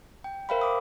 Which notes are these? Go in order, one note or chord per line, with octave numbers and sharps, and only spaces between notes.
G5
A#4 C5 E5 F5 G5 B5
C5 D6 D#6